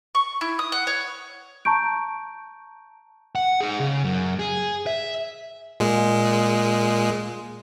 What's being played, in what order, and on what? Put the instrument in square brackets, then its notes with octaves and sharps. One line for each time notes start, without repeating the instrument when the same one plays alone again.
[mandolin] C#6
E4
D#6
F#5
C#5
[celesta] A5 A#5 C#6 G6 D7
[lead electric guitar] F#5
D#4 G#4
C#3
F#2
G#4
E5
[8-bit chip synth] A#2 G#3